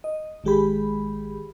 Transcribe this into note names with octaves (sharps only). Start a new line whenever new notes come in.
D#5
A1 D#3 G#3 G4 G#4 B5